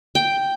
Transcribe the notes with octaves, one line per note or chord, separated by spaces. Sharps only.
G5